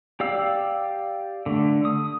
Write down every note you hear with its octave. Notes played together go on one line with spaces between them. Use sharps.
G4 D5 F5 E6
D3 A3
D#6